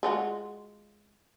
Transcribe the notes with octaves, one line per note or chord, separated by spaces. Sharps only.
G#3 F4 F#4